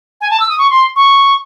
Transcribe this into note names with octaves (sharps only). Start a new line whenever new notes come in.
G#5
A5
E6
D#6
C#6
C6
C#6